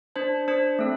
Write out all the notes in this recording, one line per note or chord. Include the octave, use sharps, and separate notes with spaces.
D4 C5 A5
D4 C5 A5
A3 C4 A4